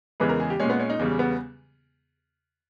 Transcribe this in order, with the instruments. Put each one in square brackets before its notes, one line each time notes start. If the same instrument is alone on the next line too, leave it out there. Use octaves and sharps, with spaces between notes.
[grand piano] E2 C#3 E3 G#3 B4
A#4
G#4
G4
A#2 G#3 C#4
B3
C#4
D#4
E2 C#3 G3
B3